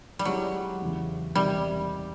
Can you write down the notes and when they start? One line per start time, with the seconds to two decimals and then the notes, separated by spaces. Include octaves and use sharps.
0.19 G3
0.25 D#3 F#3 G#3 C#4 E4 G4
0.81 E2 C#3 E3 G#3
1.35 E2 C3 D#3 G3